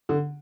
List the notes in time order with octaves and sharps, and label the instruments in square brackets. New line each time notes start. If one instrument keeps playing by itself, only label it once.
[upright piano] D3